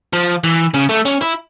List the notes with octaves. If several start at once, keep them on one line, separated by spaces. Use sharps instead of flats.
F3
E3
C#3
A3
C#4
E4